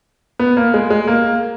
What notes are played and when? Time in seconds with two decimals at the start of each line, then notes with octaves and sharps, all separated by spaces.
0.39 B3
0.57 A#3
0.74 G#3
0.90 G#3
1.08 A#3